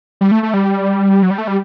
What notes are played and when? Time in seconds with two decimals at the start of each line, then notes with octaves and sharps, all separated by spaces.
0.21 G3
0.31 A3
0.43 A3
0.54 G3
1.23 F#3
1.31 G3
1.38 A3
1.48 G3